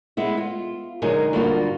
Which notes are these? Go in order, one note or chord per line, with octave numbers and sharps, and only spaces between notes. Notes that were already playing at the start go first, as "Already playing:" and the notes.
G#3 B3 E4
F4
D3 F#3 G#3 D#4 G#4 A#4
G2 D3 A#3 F4 F#4